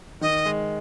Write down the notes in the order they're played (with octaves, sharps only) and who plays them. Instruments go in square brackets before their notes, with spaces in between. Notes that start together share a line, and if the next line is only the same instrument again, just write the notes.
[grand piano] D#3 [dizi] D#5
[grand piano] G#3